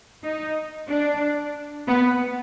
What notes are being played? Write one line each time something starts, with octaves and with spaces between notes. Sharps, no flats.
D#4
D4
B3